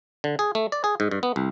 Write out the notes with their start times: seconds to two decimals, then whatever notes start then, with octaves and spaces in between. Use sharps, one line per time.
0.24 D3
0.39 G#4
0.55 A3
0.72 D5
0.84 G#4
1.00 G#2
1.11 G2
1.23 B3
1.36 C2